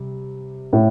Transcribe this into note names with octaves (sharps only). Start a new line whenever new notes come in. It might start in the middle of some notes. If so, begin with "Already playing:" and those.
Already playing: C3 G3
A2